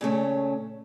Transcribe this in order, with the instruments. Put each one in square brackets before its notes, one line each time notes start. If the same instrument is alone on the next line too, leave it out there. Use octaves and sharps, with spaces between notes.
[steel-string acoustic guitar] A#2 C#3 A3 C#4